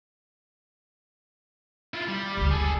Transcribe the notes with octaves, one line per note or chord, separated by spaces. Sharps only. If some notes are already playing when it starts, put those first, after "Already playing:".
E4 F4
G3
F#1 D2
G#4 A4